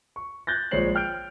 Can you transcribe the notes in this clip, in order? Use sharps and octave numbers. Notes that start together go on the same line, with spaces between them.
C#6
F#6 G6 A6 A#6
A#1 G#3 C5 C#5 C7 F#7
G5 F6 G6 D7